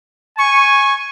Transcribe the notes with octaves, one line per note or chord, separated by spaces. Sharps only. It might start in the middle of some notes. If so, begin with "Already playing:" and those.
G#5 C#6